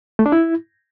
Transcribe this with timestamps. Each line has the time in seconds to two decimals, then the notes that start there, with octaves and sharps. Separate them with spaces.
0.19 A3
0.26 D4
0.32 E4